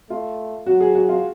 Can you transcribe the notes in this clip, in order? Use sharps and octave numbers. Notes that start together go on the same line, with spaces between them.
A3 F4
F#3 F#4
G#4
F#4
F4